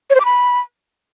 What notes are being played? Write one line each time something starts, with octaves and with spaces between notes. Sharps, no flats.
C#5
C5
D6
B5